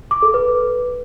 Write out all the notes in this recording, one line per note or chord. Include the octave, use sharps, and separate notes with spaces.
D6
A4
B4